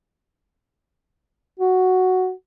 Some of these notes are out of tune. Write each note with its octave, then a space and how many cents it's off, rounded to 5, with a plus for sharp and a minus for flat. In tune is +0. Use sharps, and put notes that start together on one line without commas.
F#4 +0